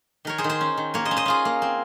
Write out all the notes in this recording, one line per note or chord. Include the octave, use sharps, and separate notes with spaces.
D#3 A#4 C#5
G#4 C5
D#3
G#4 C5
C#4
D#3
A#3 A#4 C#5
C5 D#5
C#4
C5 D#5
C#4 F4 G#4
A#3
C4